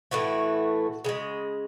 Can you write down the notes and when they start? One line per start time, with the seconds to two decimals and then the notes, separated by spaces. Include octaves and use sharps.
0.11 A2 E3 A3 F#4
1.04 C#3 E3 G#3